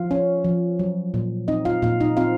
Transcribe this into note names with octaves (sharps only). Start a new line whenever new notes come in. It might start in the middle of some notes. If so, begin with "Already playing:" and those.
Already playing: F3 F4 F5
C#4
F3
F#3
A#2
C4 D#4 D#5
F4 F5
A#2 F4 F5
D#4 D#5
C4 F4 F5